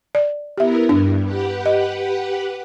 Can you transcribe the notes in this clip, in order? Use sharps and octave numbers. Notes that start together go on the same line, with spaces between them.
D5
B3 E4 G4 A#4 E5
G2 D4
G4 B4 F#5
D#5